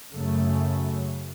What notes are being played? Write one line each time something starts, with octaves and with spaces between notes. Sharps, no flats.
F#2 C#3 A3